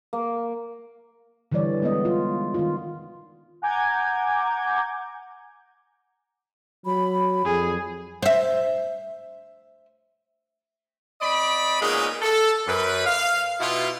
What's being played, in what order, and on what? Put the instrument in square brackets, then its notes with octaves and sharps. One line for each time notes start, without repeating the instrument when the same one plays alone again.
[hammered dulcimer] A#3
[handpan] D3 E3 G3 C#5 D5
G#3 B3 D#5
F4
D#3 F4
[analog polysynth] F#5 G#5 A#5 D6 G6 G#6
[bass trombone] F#3 [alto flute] B5
[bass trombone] F2 [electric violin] G#4
[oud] C5 E5
[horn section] C4 D5 D#5 B5
A#2 G#3 A#3 B3 C#4 D#4
A4
F#2 B4
F5
B2 E4 F4